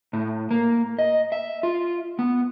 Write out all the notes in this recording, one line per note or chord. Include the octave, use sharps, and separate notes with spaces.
A2
A#3
D#5
E5
F4
B3